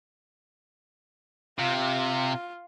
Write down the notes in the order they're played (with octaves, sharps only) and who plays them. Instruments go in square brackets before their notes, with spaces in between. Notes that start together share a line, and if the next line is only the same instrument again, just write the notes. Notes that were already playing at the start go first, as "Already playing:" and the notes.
[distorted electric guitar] C3 [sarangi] F4